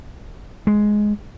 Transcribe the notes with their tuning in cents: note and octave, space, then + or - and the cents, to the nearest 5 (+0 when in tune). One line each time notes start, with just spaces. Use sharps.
G#3 +5